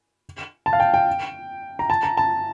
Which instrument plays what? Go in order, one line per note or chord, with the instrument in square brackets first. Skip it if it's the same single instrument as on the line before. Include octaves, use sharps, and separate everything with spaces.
[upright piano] A5
F5
G5
G5
A#5
A5
A#5
A5